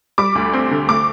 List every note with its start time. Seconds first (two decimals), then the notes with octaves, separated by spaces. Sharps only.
0.18 G3 D6
0.35 D2
0.53 C4
0.71 D3
0.89 A3 D6